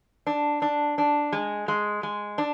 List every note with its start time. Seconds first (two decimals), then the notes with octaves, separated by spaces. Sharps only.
0.27 D4
0.62 D4
0.98 D4
1.33 G#3
1.68 G#3
2.03 G#3
2.38 D4